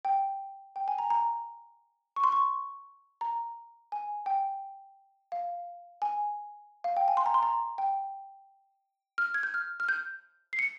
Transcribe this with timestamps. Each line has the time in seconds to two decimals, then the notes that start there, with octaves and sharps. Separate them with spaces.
0.05 G5
0.76 G5
0.88 G#5
0.99 A#5
1.10 A#5
2.16 C#6
2.24 C6
2.32 C#6
3.21 A#5
3.92 G#5
4.26 G5
5.32 F5
6.02 G#5
6.84 F5
6.97 G5
7.08 G#5
7.17 C6
7.26 A#5
7.34 C6
7.43 A#5
7.78 G5
9.18 F6
9.34 G#6
9.43 G6
9.54 F6
9.80 F6
9.89 G6
10.53 C7
10.59 C#7